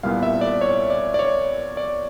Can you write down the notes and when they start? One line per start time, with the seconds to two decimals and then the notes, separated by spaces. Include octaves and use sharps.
0.03 C2 A#2 G3 B3 E4 F5
0.23 E5
0.41 D5
0.61 C#5
0.90 D5
1.14 D5
1.19 C#5
1.77 D5